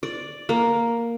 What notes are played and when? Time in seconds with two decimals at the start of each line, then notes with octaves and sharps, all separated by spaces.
0.03 D5
0.49 A#3